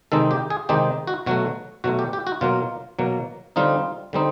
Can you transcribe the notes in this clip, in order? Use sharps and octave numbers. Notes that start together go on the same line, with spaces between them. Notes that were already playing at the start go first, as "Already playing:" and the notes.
C3 D#3 G#3 C4 D#4 A4
G4
G#4
C3 D#3 G#3 C4 D#4 G4
F#4
B2 F#3 A3 F#4
B2 F#3 A3 F#4
G4
G4
F#4
B2 F#3 A#3 F4
B2 F#3 A#3
D3 G3 C4 D#4 F4
D3 G3 C4 D#4